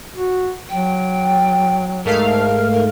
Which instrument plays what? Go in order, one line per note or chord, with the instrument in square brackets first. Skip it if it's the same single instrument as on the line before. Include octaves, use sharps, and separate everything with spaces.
[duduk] F#4
[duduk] F#3 [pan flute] G5
[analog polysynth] G#2 A3 F5 [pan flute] A#4
[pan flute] A#4